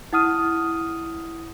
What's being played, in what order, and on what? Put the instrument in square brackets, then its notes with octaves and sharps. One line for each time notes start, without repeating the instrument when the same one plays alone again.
[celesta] E4 F#5 D#6 F6 D#7